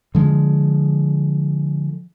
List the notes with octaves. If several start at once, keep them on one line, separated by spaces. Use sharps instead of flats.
D3 F3 G#3